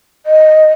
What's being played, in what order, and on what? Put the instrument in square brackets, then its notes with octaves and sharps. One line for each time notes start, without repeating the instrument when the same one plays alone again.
[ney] D#5